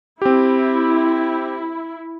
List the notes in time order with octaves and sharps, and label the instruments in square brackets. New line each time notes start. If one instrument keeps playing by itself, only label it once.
[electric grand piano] C4 G4 [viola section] E4